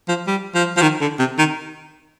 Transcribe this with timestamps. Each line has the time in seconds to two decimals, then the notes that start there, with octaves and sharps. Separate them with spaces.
0.08 F3
0.27 G3
0.54 F3
0.77 F3
0.82 D#3
1.01 D3
1.19 C3
1.38 D#3